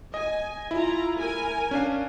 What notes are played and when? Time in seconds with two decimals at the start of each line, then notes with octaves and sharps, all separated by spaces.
0.14 D#5 G#5
0.71 E4 F4 A#5
1.19 A#4 G#5
1.71 C#4 D4 F5